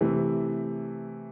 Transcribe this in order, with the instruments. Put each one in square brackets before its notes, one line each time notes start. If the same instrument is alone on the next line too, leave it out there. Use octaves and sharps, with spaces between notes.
[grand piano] C3 E3 A3